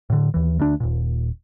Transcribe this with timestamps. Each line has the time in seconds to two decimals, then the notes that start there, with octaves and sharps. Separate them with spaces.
0.10 A2 D3
0.34 D#2 E3
0.60 D2 D4
0.80 D#1 A#2